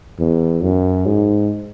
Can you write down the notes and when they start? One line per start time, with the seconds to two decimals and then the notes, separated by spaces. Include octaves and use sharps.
0.19 E2
0.62 F#2
1.06 G#2